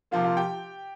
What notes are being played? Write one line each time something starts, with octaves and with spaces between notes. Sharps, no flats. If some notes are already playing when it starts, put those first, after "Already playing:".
C3 F3 A#3 F4 F5
F4 F5
G4 G5